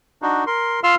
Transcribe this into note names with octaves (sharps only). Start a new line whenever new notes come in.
D4 D#4 F#4
A#4 C6
F4 F5 C6 E6 F6